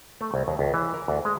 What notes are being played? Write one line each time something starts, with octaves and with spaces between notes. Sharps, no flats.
A3
C2
D#2
C#2
E3
A#4
D2
G#3